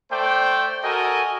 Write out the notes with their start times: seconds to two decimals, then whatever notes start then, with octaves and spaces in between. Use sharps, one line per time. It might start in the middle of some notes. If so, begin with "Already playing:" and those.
0.12 A3 C5 D5 G5
0.84 F#4 A4 A#4 D#5 G#5